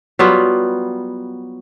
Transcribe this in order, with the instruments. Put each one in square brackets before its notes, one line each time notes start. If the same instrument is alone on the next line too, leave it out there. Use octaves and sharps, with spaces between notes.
[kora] F#3 G3 B3 F4